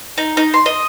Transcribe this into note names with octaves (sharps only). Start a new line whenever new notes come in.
D#4
D#4
C6
D#5